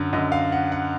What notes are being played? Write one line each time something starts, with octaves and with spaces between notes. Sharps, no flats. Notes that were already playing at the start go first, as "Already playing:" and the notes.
Already playing: F#2 D3
F#2 D3 D#5
F5
F#5
F#5